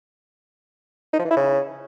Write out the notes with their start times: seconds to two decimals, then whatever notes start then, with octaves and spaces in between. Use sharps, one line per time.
1.13 D#4
1.19 F3
1.25 E3
1.31 E4
1.37 C#3